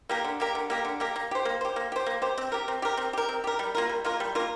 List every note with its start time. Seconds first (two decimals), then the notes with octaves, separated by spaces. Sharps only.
0.09 A#3 G4 A#4
0.24 D3
0.40 A#3 G4 A#4
0.55 D3
0.70 A#3 G4 A#4
0.85 D3
1.00 A#3 G4 A#4
1.16 A#3
1.31 G4 C5
1.45 A#3
1.61 G4 C5
1.76 A#3
1.92 G4 C5
2.06 A#3
2.22 G4 C5
2.38 C4
2.52 G4 A#4
2.68 C4
2.82 G4 A#4
2.97 C4
3.13 G4 A#4
3.29 C4
3.44 G4 A#4
3.59 G3
3.75 A#3 F4 A#4
3.89 G3
4.04 A#3 F4 A#4
4.20 G3
4.35 A#3 F4 A#4